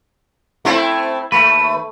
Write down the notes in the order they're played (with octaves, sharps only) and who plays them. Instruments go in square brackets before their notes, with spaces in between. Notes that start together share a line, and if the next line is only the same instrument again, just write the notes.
[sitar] A3 C4 E4
[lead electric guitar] D#2 B4 [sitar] A3